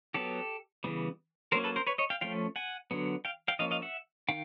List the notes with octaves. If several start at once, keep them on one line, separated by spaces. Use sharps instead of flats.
F#3 B3 G4 A4
C#3 E3 G3 B3
F#3 A#3 C#4 A#4 C5
A4 B4
A#4 C5
B4 C#5
C#5 D#5
F5 G5
F3 A3 C#4 F5 G5
F#5 G#5
D3 F#3 B3
F5 G5
F5 G5
F3 A#3 C#4 D#5 F5
D#5 F5
E5 F#5
D#3 F5 G5